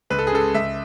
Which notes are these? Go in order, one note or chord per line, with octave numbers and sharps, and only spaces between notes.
C#2 B4
A4
G#4
C#3 G#3 A4
C#2 E5